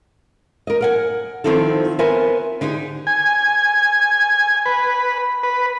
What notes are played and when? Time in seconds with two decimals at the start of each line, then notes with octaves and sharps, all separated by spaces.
0.67 A#4 D#5
0.81 A#4 F#5 G#5
1.44 D#3 F3 C4 D#4 E4 A4
1.99 B3 A#4 C5 E5 G#5
2.61 D3 D#4 G4 G#4 G#5
3.07 G#5
4.66 B4
5.43 B4